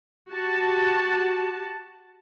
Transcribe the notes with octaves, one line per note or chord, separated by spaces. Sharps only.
F#4 G4 A5